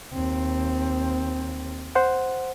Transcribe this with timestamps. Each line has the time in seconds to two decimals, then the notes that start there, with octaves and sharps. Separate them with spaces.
0.13 D#2 C4
1.95 C5 F#5